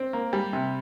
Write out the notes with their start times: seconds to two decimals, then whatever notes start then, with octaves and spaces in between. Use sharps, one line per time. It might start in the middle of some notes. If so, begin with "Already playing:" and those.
Already playing: C4
0.13 A#3
0.33 G3
0.53 C3